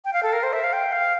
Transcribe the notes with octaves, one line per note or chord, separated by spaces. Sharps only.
G5
F5
A4
A#4
C5
E5
F5
G5
F5